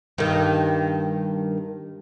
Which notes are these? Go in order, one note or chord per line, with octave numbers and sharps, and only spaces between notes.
G2 D#3